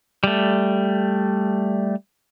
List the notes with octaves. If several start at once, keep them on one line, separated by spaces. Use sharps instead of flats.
G3 A3